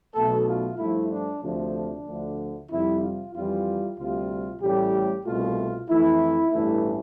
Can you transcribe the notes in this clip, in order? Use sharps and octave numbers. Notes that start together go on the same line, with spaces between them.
B1 B2 A3 A4
F4
G2 F3 A3 E4
D4
D2 C3 F3 A3 D4
D2 D3 F3 A3
F2 C3 G3 E4
F4
F2 E3 G3 F4
D2 C3 G3 F4
A1 A2 G3 G4
C2 B2 A3 F4
F2 E3 A3 E4
A1 G2 E3 A3 E4